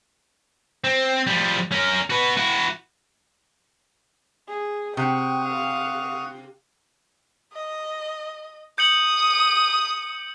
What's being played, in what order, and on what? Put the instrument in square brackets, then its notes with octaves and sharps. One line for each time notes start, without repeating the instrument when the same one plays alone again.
[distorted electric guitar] C4
F3 G3
C#4 A#4
F#4 B4
E4 F#4
[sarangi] G#4
[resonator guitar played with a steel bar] C3 [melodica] F#5 C#6 D#6 [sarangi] G5
[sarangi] F5
[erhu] D#5
[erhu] D#6 [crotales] G6 C#7 F#7